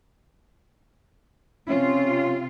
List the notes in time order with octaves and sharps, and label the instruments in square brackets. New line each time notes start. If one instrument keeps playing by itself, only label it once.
[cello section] C3 C4 F4 [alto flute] C#4